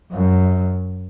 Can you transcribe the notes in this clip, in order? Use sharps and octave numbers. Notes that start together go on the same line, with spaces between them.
F#2